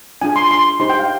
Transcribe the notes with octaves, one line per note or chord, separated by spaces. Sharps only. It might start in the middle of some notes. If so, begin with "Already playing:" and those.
D4 F4 G#4 G#5
C6
C6
D#4 G4 C5 C6
G5
F5